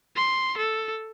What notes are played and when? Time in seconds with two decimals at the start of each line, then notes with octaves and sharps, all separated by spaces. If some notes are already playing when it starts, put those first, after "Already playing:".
0.16 C6
0.57 A4